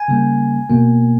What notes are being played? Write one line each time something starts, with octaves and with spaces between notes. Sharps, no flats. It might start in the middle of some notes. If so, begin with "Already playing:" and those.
Already playing: G#5
C#3 G3 A#3
B2 A#3